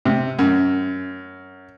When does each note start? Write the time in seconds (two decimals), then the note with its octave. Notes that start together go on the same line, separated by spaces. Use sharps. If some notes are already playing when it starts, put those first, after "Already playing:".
0.05 C3
0.39 F#2